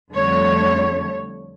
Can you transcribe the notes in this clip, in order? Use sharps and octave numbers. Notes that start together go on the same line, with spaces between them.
F2 D3 G3 A3 C#5